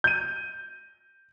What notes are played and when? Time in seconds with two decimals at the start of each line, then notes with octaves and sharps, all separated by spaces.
0.04 G6 D#7